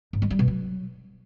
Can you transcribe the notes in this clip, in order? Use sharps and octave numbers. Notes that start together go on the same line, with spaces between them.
G#2
G#3
G3
B2
F#3